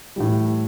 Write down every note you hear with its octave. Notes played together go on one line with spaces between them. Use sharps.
A2 E3 G3